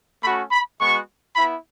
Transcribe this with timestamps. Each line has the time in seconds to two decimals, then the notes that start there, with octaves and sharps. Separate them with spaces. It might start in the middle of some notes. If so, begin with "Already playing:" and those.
0.23 A3 C#4 F#4 B5
0.51 B5
0.80 G#3 B3 F#4 C#6
1.36 B3 E4 B5